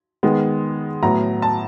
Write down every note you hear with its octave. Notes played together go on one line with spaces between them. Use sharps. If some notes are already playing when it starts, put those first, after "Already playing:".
D#3 G#3 B3
A2 F#3 B3 A#5
A5